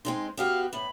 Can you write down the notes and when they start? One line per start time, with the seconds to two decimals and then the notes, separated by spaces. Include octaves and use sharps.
0.05 G#3 C4 D#4 C6
0.37 B3 F#4 G4 F5
0.73 A2 B5